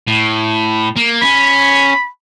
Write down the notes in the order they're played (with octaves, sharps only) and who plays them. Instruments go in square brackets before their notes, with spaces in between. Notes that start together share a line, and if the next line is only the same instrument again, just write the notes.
[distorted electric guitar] A2
A#3
[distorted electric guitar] C#4 [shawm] B5